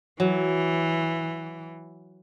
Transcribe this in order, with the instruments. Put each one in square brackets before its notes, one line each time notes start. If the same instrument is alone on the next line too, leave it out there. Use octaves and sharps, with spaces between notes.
[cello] E3 [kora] F#3